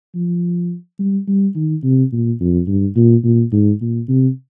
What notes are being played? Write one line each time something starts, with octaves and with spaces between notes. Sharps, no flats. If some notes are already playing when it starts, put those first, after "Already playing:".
F3
G3
G3
D#3
C3
A#2
F2
G2
A#2
A#2
G#2
A#2
C3